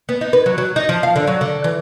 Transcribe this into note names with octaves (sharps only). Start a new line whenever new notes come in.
B3
D#4
B4
F#3
F#3
D#4
F3
F5
D3
F#3
D3
E3